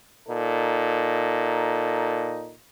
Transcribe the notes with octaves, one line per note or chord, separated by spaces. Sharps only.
A#2 D#4 A4